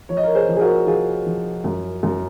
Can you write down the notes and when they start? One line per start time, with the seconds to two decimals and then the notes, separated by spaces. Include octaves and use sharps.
0.09 F3 C#5
0.17 D#5
0.23 A#4 C#5
0.35 G#4 C5
0.49 F3
0.56 G#4
0.61 F#4 A#4
0.87 F3 F4 G#4
1.26 F3
1.64 F#2
2.03 F#2